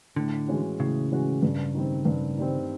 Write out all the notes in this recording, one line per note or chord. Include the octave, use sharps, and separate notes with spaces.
A2 D3
E3 G#3 C#4 F#4
A2 C#3
E3 G#3 C#4 F#4
G2
D#3 G3 C4
G2
D#3 G3 C4